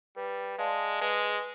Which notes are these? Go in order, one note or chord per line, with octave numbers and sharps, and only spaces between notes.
G3 B4
G#3 D5 F5 A5 C6
G#3 B4